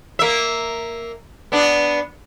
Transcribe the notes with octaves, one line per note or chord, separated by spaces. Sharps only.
A#3 E5
B3 D4